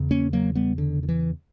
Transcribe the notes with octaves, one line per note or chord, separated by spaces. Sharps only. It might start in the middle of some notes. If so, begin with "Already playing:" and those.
Already playing: E2 C#3
A#3 C#4
F#3 A#3
G3 B3
D3
D3
E3